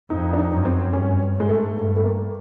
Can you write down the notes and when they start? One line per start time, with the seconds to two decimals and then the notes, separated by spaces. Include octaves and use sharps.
0.10 F2 D#4
0.33 D4
0.38 D#4
0.52 F#2
0.65 C4
0.93 G2 C#4
1.35 G#2
1.40 G#3
1.49 A3
1.77 G2 A3
1.96 A3
2.04 A#3